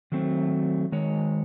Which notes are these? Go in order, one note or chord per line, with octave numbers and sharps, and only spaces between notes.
D#3 F#3 A3 C4
D#3 G#3 C#5